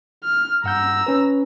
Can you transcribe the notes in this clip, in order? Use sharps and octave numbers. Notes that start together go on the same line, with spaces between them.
F6
G2 F#5 A#5 E6 G6
C#4 B4